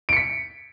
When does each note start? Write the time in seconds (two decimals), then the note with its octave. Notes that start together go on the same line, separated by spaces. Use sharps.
0.09 D7
0.13 C#7
0.17 B6